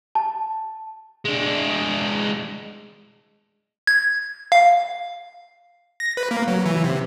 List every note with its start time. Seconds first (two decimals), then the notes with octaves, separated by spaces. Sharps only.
0.15 A5
1.25 G#3 D4
3.87 G#6
4.52 F5
6.00 A#6
6.17 B4
6.31 A#3
6.48 F#3
6.66 E3
6.84 C3